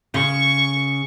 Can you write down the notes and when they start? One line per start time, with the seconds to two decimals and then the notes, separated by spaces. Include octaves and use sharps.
0.14 C#3 C#6